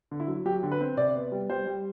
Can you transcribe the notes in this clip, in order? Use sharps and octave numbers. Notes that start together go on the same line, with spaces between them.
D3
E4
F#3
F#3 G4
D3
B4
C4
C3 D5
B3
G3
G3 C5
G3